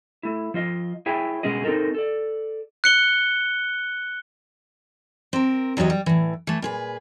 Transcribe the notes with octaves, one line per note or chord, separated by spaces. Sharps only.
A3 E4
F3 F4 D#5
E4 G#4 C#5 E5 G5
B2 G#3 C#4 G#4 D#5
C4 D#4 E4 A4 A#4
A4 D5
F#6 C#7 G7
C4 A#4
E2 F#3 G4 C#5 D#5
G3
A2 E3
E3 A3
A#2 G#4 B4